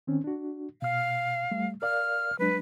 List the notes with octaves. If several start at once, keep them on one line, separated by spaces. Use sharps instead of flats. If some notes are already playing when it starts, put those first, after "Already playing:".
D#3 C4 C#4
D4 F#4
B2 F5 F6
G3 A3
A#4 D5 F5 F6
F#3 G#3 D4 B4